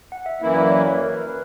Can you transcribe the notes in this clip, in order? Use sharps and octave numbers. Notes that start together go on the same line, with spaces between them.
F#5
E5
F#2 E3 A#3 E4 E5
D5
C#5
B4
A#4
B4